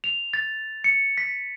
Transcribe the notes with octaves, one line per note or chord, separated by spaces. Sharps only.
F7
A6
C#7
B6